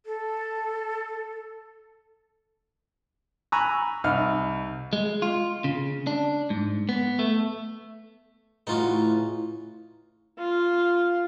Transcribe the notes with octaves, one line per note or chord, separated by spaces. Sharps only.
A4
G#5 A#5 B5 C#6 E6 F#6
C2 D#4 F6
G#3
F4
C#3
D4
G#2
B3
A3
A2 C#3 E3 D#4 F4 F#4
F4